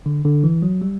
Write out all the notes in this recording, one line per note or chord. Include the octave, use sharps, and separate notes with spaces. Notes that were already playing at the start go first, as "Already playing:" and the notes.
D3
D3
E3
F#3
G3